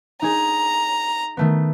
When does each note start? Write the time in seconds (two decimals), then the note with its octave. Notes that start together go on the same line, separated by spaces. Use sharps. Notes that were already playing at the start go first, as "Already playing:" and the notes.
0.22 D#4 G#4 A#5
1.37 D#3 A3 B3